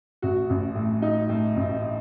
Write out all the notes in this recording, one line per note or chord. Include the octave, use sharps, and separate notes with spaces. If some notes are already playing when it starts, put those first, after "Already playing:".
A1 F#4
A1
A2
A2 D#4
A2
A1